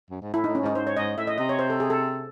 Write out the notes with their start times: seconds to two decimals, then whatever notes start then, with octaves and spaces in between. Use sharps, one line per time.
0.10 F#2
0.22 G#2
0.34 A2 E4
0.44 D#4
0.48 A2
0.55 C#4
0.62 G#2 D#4
0.75 G#2 C5
0.87 C#5
0.97 G#2 D#5
1.18 A2 E5
1.27 D#5
1.38 C3 D#5
1.49 C#5
1.59 C5
1.70 A4
1.80 G#4
1.90 A4